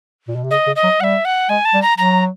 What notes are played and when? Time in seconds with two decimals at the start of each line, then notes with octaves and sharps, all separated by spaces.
0.28 A#2
0.36 B2
0.44 C3
0.51 C#3 D#5
0.67 C#3
0.76 D#5
0.84 F#3
1.00 G3 E5 F#5
1.25 F#5
1.49 G#3 G#5
1.65 A5
1.74 G3
1.82 A#5
1.98 F#3 A#5